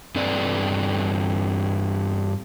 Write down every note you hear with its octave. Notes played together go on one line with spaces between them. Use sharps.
G2 C4 A4 B4 D5